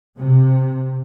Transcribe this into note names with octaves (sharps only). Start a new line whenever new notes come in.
C3